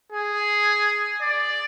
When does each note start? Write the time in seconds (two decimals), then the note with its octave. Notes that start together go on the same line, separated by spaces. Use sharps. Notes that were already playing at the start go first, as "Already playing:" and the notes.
0.12 G#4
1.22 D5